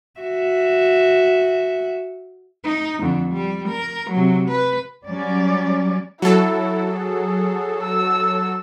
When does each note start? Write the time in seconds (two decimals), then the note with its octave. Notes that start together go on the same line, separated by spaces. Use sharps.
0.20 F#4 E5
2.64 D#4
3.01 F2 D3
3.32 G3
3.69 A#4
4.11 C3 F#3
4.50 B4
5.06 F#3 G3 C#4 D5
6.22 F#3 E4 A4
6.93 G#4
7.83 E6